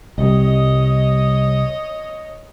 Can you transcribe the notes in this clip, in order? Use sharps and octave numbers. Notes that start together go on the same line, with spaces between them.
C2 G3 C#5 D#5